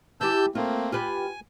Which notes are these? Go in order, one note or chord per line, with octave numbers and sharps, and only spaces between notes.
E3 G4 A5 E6 G6
A3 A#3 C4 F4
F4 G4 B4 G#5